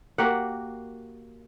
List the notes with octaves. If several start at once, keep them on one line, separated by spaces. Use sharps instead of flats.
A#3 F#4 G4 F#5